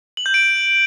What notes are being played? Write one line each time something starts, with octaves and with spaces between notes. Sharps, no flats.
F#7
G6
D7